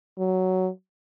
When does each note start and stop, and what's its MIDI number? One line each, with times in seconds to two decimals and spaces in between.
0.18 0.69 54